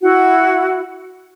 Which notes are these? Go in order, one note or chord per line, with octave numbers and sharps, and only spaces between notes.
E4 F#4